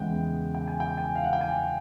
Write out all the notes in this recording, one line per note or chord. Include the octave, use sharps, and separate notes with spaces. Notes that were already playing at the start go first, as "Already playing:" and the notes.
Already playing: E2 C#3 E3 G#3 B3 F#5 G5
G5
G#5
G5
G#5
F5
F#5
G5
G#5